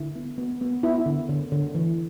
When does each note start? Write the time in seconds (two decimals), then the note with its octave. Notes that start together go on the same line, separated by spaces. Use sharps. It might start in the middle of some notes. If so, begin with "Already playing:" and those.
Already playing: D3 E4
0.16 B3
0.38 B3
0.61 B3
0.83 B3 E4
1.06 D3
1.29 D3
1.52 D3
1.75 E3